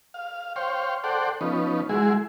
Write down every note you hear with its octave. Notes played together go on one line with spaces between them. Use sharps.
F5
C5 C#5 F5 G5
A4 C5 D5 F#5 G5
F3 B3 C#4 D#4
F#3 G#3 E4 G#4